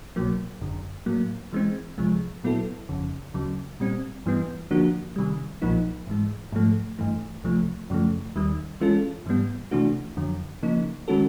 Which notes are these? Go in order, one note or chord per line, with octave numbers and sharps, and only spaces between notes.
C2 B2 F#3 A#3
G1 F#2 D3
A2 F#3 A#3
E3 G#3 C4
C#2 C3 F3 G#3
A#2 F#3 B3 E4 A4
G1 F2 C#3
D2 C#3 F#3
A#2 G3 C4
G2 E3 G3 B3
D3 F3 A#3 D4 F#4
C3 D#3 G3
B1 A#2 F3 A#3 D#4
G#2 E3 G#3
G#2 F3 A3
G#1 G2 E3 A3
C#2 C3 F3 A3
F#2 C#3 F3 A3
D#2 D#3 G3
E3 G#3 C#4 F4 A4
G#2 E3 G3 B3
C3 E3 A3 D4 F#4
F2 D3 F#3
C#3 F3 A#3 D#4
D#3 G#3 C#4 F#4 A4